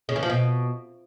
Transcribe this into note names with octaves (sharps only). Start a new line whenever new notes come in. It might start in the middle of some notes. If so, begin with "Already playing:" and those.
C#3
E3
F3
B2